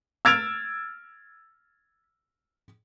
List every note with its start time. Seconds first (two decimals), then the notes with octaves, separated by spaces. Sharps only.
0.25 E6 F6 G#6 A6 D7 F7